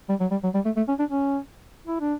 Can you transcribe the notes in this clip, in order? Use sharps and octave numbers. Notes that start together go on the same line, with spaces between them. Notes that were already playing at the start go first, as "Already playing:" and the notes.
G3
F#3
G3
F#3
G3
A3
A3
C#4
D4
C#4
E4
D4